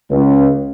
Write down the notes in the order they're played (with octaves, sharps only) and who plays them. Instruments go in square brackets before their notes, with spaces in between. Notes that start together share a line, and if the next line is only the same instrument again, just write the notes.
[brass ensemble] C#2